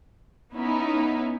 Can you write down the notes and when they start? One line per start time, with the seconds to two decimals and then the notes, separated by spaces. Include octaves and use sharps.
0.53 B3 C#4 D#4 E4